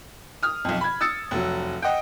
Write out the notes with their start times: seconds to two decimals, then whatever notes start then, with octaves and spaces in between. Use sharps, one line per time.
0.43 D#6 F6
0.65 B1 F2
0.81 B5 G#6
1.01 D#6 E6 A6 C#7
1.31 F1 F#3
1.82 D#5 F#5 G5